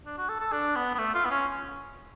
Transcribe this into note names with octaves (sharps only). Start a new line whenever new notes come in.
D4
F#4
A4
A4
D4
B3
B3
A3
F4
B3
C#4